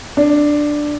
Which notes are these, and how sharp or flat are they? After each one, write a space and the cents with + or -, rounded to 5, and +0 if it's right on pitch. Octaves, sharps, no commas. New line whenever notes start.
D4 +5